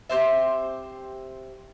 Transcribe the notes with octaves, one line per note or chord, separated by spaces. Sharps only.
C4 G4 C5 E5